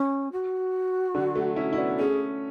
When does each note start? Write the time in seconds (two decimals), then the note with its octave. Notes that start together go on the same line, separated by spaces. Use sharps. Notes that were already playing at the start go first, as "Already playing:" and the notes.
Already playing: C#4
0.32 F#4
1.15 D3 F#3
1.35 F#3 A3
1.56 C#4 E4
1.73 E4
1.77 B3 D4
1.90 B3
1.99 A3 C#4 G#4